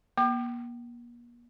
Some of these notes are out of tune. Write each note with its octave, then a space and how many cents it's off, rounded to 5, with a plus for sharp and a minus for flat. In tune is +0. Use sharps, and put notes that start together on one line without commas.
A#3 +40 D6 +40